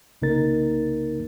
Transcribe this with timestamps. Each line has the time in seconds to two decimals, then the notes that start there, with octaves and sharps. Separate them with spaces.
0.22 C2 C#3 A#3 D#4 A#4 A6